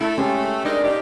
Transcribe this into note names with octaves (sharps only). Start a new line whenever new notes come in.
A3 E4 A4
G#3 C#4 G4
F2 G#3 D4 D#4 A#4
A#2 D#4 G4